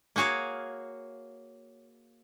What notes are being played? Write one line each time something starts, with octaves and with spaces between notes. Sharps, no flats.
A#3 F#4 G#4 C#5 F5